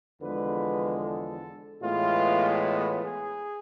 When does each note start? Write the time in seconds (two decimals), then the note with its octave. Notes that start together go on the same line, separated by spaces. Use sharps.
0.20 E2 D3 F3 G#3 B4
1.01 A4
1.82 A2 E3 G#3 B3 F4
2.63 F4
3.03 G#4